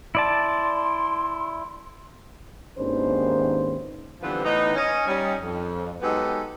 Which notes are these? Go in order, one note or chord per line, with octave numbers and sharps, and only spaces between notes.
E4 D5 A5 C6
G#1 D#2 C#4 D4 B4 C5
D3 E3 F3 G3 B3 C4
A2 E3 B3 D#4
C#4 D#5
G3 C#4 D#4
F2
F#3 G#3 B3 D#4 G4 A4